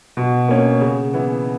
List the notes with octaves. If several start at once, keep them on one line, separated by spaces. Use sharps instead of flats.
B2
A#3 C#4
C#3
E3 B3 E4